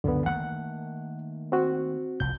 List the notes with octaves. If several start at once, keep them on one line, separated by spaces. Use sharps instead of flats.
C#2 F#2 D3 B3
D#3 A3 A#3 F#5
C4 F#4
F1 C2 F3 G6